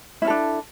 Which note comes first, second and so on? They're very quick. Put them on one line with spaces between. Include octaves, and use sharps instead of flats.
E4 C#4 A4 D4